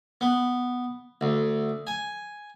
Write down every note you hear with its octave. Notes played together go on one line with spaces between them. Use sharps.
B3
D2
G#5